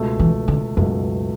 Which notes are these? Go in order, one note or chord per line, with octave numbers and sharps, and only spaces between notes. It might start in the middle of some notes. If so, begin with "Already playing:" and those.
Already playing: C#2 B2 A3
E3
D3
C#2 F#2 B2 A3